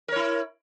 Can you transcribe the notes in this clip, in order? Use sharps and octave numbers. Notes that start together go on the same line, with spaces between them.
E4 A#4 C#5